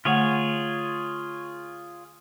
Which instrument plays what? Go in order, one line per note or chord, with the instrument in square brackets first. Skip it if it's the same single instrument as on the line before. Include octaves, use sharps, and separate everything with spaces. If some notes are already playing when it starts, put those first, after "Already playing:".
[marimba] D3 A3 F#5 [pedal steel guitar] F4 G#4 C#5